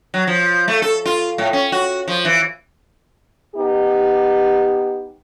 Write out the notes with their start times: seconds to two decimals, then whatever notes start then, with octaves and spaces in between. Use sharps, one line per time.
0.14 F#3
0.27 F3
0.68 A3
0.82 A4
1.06 F4
1.38 A2
1.53 C#4
1.72 F#4
2.08 F3
2.25 E3
3.55 B3 D#4 G4